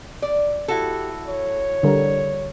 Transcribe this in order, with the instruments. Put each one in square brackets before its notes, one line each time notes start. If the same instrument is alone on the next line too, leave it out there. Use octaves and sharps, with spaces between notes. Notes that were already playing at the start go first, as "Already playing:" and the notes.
[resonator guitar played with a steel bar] D5
[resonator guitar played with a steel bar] E4 F#4 A4 [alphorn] G4
[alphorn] C#5
[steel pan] D3 G3 A#4